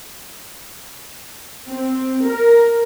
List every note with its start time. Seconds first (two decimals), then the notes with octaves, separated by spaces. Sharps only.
1.71 C4
2.27 A#4